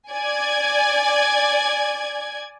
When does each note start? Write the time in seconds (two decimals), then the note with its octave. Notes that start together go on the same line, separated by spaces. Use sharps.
0.10 D5 G#5 G#6